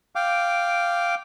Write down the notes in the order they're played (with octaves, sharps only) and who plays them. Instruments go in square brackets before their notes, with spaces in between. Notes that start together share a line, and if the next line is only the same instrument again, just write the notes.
[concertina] F5 G5 D6